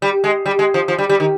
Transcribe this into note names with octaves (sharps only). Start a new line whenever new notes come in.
G3
G#3
G3
G#3
F3
F3
G3
G3
D#3